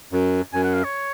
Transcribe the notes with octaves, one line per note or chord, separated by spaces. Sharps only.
F#2
F#2 G#5
F#5
F5
C#5